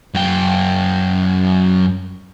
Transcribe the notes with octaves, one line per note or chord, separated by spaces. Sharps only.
F#2 G5